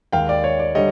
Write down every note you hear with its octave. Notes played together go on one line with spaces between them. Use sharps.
D#2 D#3 G#3 F5 G5
D5
C#5
D5
D3 G3 C#5 D#5